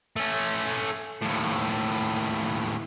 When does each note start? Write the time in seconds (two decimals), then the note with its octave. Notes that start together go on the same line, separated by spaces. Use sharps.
0.16 A3 C#4
1.22 D#2 A2